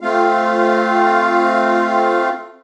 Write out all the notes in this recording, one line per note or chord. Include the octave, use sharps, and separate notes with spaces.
A3 C4 F4 F5